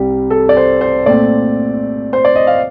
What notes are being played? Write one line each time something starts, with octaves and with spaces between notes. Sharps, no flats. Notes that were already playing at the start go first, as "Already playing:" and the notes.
Already playing: C2 C3 G3 G4
A4
D5
C5
C5
A#2 A3 C4 D5
C5
D5
D#5
F5